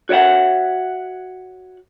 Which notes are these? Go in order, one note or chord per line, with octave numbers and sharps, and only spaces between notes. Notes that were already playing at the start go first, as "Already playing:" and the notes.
F#4 C#5 D5 E5 F#5